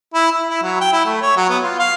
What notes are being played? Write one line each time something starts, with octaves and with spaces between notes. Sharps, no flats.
E4
E4
E4
F#3
G5
E4
A3
C#5
F#3
B3
F4
F5